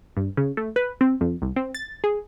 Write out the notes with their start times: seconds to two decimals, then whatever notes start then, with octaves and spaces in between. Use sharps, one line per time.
0.17 G2
0.37 C#3
0.57 A3
0.76 B4
1.01 C4
1.21 F2
1.42 C2
1.56 C4
1.75 A6
2.04 G#4